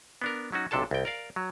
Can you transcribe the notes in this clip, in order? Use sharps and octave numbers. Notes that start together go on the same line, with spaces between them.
B3 D4 A#4
F#3 C#4 D#4 F#4
B1 C3 D4 A4 A5
C2 G5
A#4 D5 F5
F#3